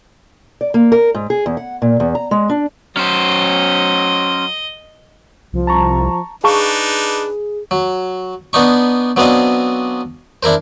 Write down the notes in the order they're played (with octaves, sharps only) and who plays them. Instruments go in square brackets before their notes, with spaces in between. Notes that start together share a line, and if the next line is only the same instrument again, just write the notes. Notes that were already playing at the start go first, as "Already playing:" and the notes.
[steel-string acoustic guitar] D5
A#3
A#4
G#2
G#4
E2
F#5
A#2
E2
A#5
G#3
D4
[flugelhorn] F#3 [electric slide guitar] C#4 C5 [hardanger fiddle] D#5
[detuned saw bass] C2 [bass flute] F3
[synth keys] A5 A#5 C#6
[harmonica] D4 D#4 B4 [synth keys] G#4 [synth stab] F5 A5 C#6
[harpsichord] F#3
B3 D4 D#4 C#6
F#3 B3 C4 D4 D#5 F5
D4 E4 A#4 C5